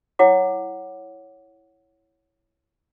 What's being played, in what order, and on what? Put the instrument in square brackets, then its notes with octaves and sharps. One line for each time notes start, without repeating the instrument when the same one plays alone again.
[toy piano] E4 C#5 F#5 D6